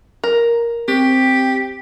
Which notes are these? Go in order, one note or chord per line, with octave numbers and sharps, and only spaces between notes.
A#4
C4 G4